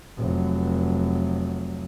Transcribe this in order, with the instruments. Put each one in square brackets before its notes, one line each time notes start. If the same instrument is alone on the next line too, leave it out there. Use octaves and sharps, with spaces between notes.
[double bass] F1 F#3